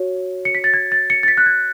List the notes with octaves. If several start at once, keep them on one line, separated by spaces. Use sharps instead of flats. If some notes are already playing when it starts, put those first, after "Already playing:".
Already playing: F#4 C#5
C#7
B6
A6
G#6
A6
C#7
A6
B6
F#6
G#6